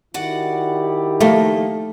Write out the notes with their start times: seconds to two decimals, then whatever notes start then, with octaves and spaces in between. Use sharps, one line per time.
0.14 D#3 E4 F#4 G4 D5 F#5
1.20 F3 A3 A#3 D#4